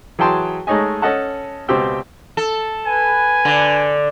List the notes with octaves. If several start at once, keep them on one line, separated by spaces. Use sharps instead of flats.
E3 F#3 G#4 G5 A5 C6
G#3 A3 D#4 C#5 D#5 G#5
C#4 A4 D#5 F#5 A5
C#2 B2 C4 G4 G5 E6
A4
B4 G#5
D3